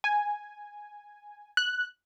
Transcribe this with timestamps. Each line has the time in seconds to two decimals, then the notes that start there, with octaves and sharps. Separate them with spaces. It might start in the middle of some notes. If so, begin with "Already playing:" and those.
0.04 G#5
1.57 F#6